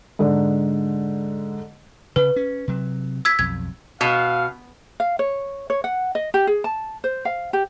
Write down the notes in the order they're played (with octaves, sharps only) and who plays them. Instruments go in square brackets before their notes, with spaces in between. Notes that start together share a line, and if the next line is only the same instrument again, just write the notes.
[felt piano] G#2 D3
[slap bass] C#3 [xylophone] B4
[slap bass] C#4
C3 F#3
[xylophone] E6 G#6 B6
[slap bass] B1 F2 [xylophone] G#6
[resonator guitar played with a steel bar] B2 [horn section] F5
[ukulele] F5
C#5
C#5
F#5
D#5
G4
G#4
A5
C5
F5
G4